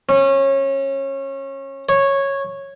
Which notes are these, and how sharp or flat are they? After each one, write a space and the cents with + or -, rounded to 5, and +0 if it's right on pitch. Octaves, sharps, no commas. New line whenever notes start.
C#4 -25
C#5 -10